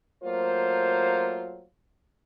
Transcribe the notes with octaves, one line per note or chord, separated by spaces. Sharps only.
F#3 A3 A#3 F4 C5